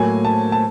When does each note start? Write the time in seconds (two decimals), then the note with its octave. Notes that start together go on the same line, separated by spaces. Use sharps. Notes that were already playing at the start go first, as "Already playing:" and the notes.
Already playing: A2 F#3 A#3 G#5
0.25 A5
0.52 A5